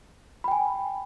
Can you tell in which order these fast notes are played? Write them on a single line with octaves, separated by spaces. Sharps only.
B5 G5 G#5